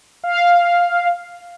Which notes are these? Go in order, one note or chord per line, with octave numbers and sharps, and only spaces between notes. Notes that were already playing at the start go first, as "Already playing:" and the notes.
F5